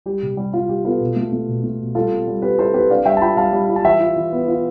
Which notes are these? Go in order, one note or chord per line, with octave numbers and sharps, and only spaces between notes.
G3 G4
C3
G3
G3 F4
G3 G4
B3 F4 A4
B2
A3
A3
B2
A3
B2
G3 F4 A4
C4
G3
C4 G4 B4
E4 A4 C5
C4 G4 B4
D4 D5 F5
G3 E5 G5
A5
F4 G5 B5
G3 F5 A5
G3
F4
A5
E3 E5 G5
F4
E3
B3
F4